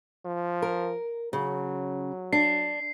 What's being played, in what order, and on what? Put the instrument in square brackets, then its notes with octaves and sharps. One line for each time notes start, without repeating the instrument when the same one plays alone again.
[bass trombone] F3
[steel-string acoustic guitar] A#4
[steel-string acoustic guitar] C#3 [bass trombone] F#3
[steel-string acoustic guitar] D4 [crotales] C7